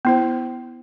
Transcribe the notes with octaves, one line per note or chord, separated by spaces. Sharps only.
B3 E4 C5